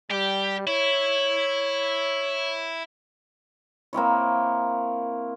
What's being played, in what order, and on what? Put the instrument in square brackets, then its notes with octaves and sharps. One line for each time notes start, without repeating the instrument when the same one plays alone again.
[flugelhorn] G3 [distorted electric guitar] G4
[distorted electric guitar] E4 [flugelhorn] C#5
[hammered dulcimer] A#3 C4 E4 C#5